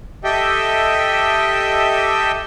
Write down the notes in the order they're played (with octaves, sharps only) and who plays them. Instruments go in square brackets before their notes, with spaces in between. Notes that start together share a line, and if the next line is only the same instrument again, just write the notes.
[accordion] G4 A4 D#5 E5 G5